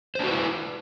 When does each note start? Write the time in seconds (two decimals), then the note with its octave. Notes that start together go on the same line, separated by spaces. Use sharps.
0.15 C5
0.19 D4
0.23 F#4
0.27 B4
0.31 E4